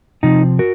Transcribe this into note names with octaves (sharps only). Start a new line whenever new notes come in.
C3 F3 C4 D#4
F#4 A#4